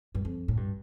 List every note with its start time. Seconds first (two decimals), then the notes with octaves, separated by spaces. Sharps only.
0.15 G2
0.25 F2
0.48 A2
0.57 G2